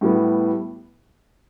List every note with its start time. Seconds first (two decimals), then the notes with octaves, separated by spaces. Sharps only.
0.01 A2 G3 B3